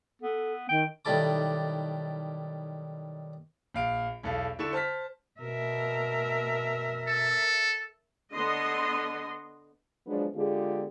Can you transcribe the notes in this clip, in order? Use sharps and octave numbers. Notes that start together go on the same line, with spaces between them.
B3 A4
D#3 G5
B1 D#3 G3 E4 A4 D6
A#1 F5 D7
B1 E2 A4 F5
D3 E4 A4 C#6 E7
C5 A5 F6 B6
B2 A#4 E5
A4
D3 B3 D#5 C6
F3 F#3 G#3 B3 D4
D3 G#3 B3 F4 G4 G#4